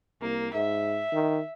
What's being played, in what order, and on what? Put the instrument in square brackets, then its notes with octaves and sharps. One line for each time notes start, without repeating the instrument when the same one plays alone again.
[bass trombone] C2 [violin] A#3
[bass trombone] G#2 [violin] E5
[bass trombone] D#3